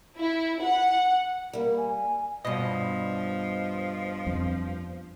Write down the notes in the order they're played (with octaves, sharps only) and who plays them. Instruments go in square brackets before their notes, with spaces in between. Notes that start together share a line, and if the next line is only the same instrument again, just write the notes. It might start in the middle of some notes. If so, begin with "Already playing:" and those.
[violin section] E4
F#5
[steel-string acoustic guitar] G3 A#3
[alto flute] G#5
[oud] G2 B2 [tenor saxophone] F3 [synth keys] D#5
[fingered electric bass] F2